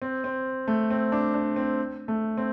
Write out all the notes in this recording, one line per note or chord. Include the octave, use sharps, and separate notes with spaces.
C4
C4
A3
C4
D4
D4
C4
A3
C4